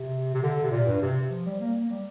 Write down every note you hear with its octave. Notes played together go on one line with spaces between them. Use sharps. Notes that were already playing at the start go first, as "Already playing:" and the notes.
Already playing: C3
C3
D3
C3
A#2
G2
C3
F3
G3
A#3
A#3
G3